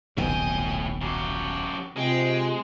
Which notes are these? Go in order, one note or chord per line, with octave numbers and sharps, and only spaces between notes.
D#1 B1 A2 C3 D#5 G5 G#5
F#2 F#4 G4
C3 G#3 F4 G5